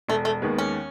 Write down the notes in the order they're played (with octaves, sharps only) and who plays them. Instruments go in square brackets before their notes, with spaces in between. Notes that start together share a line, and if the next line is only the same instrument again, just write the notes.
[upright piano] E1 [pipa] A3
[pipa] A3
[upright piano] D#2 D#3 G#3 B3
[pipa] C#4